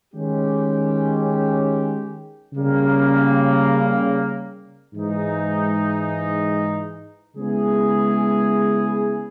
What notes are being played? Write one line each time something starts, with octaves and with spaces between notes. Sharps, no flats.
D#3 G#3 C#4 G4
C#3 G3 A#3
G#2 E3 G#3 D#4
C#3 G#3 B3 E4 G#4